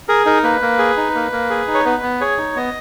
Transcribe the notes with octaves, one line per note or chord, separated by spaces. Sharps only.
G#4 A#4
D#4 A#4
A#3 B4
A#3
G#4
D#4
A#3
A#3
G#4
D#4
C#5
B3 B4
B3
G#4 C#5
D#4
B3 D#5